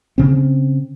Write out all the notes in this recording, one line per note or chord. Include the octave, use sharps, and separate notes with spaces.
C#3 C4